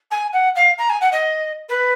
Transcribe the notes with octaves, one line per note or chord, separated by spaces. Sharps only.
G#5
F#5
F5
A#5
G#5
F#5
D#5
B4